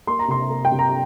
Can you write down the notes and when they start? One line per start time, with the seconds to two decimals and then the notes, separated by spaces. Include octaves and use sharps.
0.07 A#3 C6
0.19 A#5
0.28 C3 C6
0.51 A#3
0.65 G5
0.71 C3
0.79 A#5